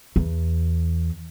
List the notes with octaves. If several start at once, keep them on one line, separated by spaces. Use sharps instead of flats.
E2